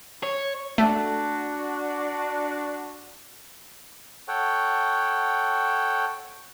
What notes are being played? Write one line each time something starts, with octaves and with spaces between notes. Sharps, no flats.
C#5
A3 D4 F#4
A4 C#5 F#5 G5